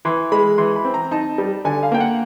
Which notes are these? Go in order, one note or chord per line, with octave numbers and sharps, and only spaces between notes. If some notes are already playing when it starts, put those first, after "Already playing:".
E3 C6
G#3 B5
E3 C6
B5
C4
A#5
D#4 A5
G3
D3 G#5
F5
A#3 G5
F#5